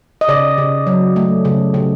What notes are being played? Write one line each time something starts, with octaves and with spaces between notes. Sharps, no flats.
D#5
C#3 D5
C#3
F#3
A3
C#3
C#3